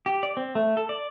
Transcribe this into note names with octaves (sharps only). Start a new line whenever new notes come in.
G4
D5
C4
A3
A4
D5